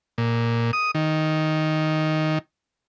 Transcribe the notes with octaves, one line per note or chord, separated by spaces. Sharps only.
A#2
D#6
D#3